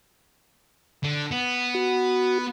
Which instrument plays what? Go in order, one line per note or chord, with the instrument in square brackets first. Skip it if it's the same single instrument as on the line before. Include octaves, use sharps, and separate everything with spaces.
[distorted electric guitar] D3
B3
[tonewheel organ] F#4